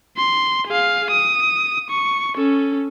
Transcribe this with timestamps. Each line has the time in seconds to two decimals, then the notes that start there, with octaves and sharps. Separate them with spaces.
0.17 C6
0.67 G#4 F5
1.11 D#6
1.90 C#6
2.37 C#4 A4